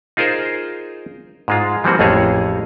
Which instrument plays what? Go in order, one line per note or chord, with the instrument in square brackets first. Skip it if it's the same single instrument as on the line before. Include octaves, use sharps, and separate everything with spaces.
[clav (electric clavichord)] D#4 F4 G#4 A#4 C5
G#2 G#3 F4
E3 F3 G3 A#3 C4 F#4
A1 F2 A3 A#3 G#4 C#5